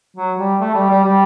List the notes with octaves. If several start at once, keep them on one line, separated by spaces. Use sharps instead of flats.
F#3
G3
A3
G3
G3
G3